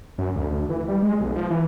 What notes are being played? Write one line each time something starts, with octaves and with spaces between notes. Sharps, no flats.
F#2
D2
D2
E3
G3
G#3
B1
F3
E3